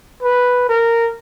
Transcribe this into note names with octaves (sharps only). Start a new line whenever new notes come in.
B4
A#4